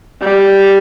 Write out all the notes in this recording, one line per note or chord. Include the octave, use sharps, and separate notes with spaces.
G3